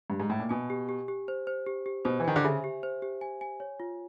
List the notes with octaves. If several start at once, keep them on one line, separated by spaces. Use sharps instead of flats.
G2
G#2
A2
A#2
B2 G#5
G4
G4
G4
C5
C5
G4
G4
B2 C5
E3
D#3 G#5
D3
C#3 E5
G4
C5
G4
G#5
G#5
C#5
F4